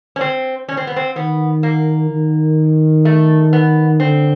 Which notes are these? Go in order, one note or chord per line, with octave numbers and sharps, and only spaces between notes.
C#4
C4
C#4
C4
B3
C4
D#3 B3
A#3
D#3
A3
B3
D3 C4